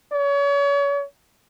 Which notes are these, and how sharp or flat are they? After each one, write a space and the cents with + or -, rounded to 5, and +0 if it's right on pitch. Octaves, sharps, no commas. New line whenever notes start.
C#5 +35